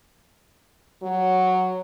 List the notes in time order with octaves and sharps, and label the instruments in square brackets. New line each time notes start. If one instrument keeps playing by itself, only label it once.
[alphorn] F#3